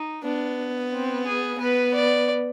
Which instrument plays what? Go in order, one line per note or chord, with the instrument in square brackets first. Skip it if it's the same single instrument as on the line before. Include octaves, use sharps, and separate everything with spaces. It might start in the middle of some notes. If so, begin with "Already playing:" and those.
Already playing: [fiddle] D#4
[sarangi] B3 [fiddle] D4
[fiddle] C4
G#4
[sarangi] B3 [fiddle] B4
[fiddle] D5